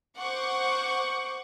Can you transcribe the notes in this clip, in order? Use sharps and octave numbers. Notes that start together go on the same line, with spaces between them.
C5 F#5 C#6 D6